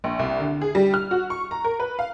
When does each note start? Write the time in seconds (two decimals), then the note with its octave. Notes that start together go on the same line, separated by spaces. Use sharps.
0.04 A#1
0.19 C2
0.40 D3
0.62 G#4
0.75 G3
0.94 F6
1.11 F#4
1.30 C#6
1.51 A#5
1.65 A#4
1.80 B4
1.99 F5